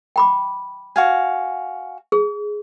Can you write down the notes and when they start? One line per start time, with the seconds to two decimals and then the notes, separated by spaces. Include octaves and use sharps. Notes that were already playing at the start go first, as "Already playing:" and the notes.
0.16 G5 B5 D6
0.96 F#4 F5 G#5
2.12 G#4